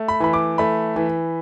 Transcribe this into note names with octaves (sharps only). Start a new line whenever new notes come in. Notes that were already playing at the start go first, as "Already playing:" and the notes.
Already playing: A3
B5
E3 B5
D6
A3 B5
E3